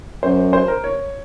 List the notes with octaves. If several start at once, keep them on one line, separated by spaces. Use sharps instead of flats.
F#2 C5
C5
A#4
C#5